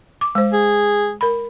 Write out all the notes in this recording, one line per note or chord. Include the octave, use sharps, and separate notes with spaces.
D6
G#3 C5
G#4
A#4 B5